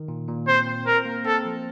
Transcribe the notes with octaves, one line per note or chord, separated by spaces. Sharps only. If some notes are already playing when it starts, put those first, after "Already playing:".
Already playing: D#3
A#2
A#2
C4 C5
C4
A#4 C5
A#3
C4 A4
F3